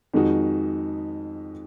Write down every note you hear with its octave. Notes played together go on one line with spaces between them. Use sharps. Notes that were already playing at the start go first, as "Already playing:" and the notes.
F2 D#3 G#3 D#4 F#4